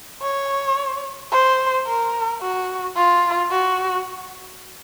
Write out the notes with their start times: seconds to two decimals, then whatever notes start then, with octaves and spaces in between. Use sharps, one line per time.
0.22 C#5
1.32 C5
1.87 A#4
2.41 F#4
2.96 F4
3.51 F#4